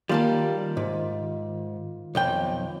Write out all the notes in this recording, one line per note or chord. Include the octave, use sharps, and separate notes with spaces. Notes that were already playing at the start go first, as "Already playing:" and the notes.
D#3 G3 A#3 F4 A5
G#2
B1 F2 G5